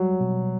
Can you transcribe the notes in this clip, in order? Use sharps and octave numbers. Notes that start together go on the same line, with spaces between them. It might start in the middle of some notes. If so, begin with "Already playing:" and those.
Already playing: F#3 G3
B2